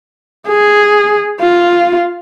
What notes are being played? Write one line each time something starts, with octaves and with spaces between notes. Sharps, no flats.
G#4
F4